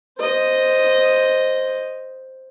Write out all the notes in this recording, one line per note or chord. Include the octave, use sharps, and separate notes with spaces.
C5 D#5